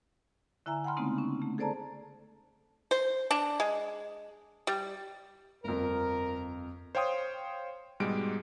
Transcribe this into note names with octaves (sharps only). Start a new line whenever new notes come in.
D3 E4 E5 G#5 A#5
F#5 G5 B5 C6 F6
C#3 G#3 A3 B3 C4 D#4
C#4
A3
G#4 A4 C5 D5 A5 A#5
C5
D4
G#3
G3
G1 F2 A#4
C5 C#5 F5 G5 C6 D#6
G#2 B2 G3 G#3 D7